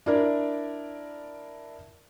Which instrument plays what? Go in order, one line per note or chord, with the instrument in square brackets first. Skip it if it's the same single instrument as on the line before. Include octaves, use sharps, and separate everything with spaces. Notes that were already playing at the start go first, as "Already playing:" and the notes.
[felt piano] D4 E4 A#4 D5